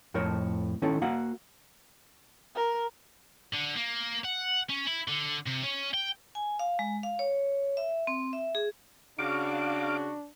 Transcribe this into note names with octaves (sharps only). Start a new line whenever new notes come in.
F2 A2 A#4 C5 C#5
D#3 C#4 E4 A4
A#3 F#4 F5 F#5
A#4
D3
A#3
F#5
C#4
E4
D3
C3
C#4
G5
G#5
F5
G#3
F5
C#5
E5
C4
E5
G#4
C#3 D4 F#4 F5 D6